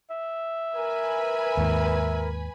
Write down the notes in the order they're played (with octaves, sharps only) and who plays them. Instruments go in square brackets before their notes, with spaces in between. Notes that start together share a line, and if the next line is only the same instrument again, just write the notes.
[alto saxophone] E5
[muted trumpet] A#4 [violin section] B4 G#5 B5
[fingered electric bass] D#2 G#2